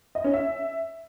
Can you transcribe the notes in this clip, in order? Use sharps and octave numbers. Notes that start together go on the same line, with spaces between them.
D#5
C#4
E5